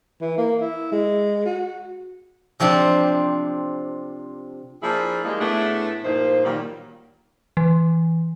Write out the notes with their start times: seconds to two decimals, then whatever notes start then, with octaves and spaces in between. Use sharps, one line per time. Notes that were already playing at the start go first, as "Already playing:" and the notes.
0.21 E3
0.38 A#3
0.61 E4
0.92 G#3
1.45 F#4
2.60 C3 F3 C4 D4 G4
4.83 F3 A#3 D4 E4 G#4
5.24 G3 G#3 A#3 D#4
5.40 A2 A3 B3 D4 E4 G#4
6.04 G2 A#2 F3 A#3 D#4 C5
6.45 A#2 D#3 F#3 G3 A#3
7.57 E3